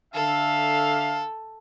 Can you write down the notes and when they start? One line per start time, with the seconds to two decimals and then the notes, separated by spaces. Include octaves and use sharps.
0.14 D3 A4 E5 F5